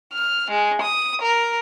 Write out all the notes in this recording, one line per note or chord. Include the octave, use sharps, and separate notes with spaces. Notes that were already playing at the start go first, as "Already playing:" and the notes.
F6
G#3
D#6
A#4